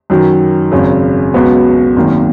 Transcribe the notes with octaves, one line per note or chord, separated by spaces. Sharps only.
F#2 D#3 F#3
G#1 F#2 C#3
C#2 B2 F#3 B3 F#4
G#1 F#2 D#3 A#3